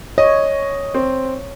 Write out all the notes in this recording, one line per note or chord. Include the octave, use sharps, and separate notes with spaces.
C#5 D#5
C4